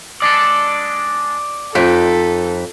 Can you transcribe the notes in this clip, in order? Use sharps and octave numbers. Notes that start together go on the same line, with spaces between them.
G#3 D4 A4 D5
F2 D#4 A4 B4 G5